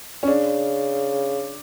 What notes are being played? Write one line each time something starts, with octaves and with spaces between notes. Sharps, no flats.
C#4
C#3 D4